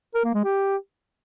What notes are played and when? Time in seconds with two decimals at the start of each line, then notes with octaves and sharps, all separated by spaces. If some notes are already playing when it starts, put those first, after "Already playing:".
0.15 A#4
0.24 A#3
0.34 G#3
0.44 G4